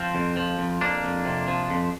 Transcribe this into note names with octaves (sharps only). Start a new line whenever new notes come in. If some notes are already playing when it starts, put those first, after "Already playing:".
Already playing: F3 C4 F4
F2
F3
F2
F2 A#3 D4
F2
C3
F3
F2